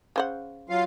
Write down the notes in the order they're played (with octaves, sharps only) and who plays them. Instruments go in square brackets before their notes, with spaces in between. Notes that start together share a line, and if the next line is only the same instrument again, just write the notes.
[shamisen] C#3 C5 F#5
[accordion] F#3 F4 F5